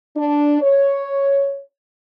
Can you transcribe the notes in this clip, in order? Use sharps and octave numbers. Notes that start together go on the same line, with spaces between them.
D4
C#5